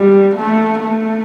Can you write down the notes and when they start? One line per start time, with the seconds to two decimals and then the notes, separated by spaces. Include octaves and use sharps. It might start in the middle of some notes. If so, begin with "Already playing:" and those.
Already playing: G3
0.36 A3
0.82 A3